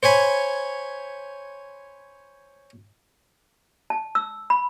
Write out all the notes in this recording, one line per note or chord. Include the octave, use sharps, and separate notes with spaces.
C5 C#5 G#5 B5
A5
E6
B5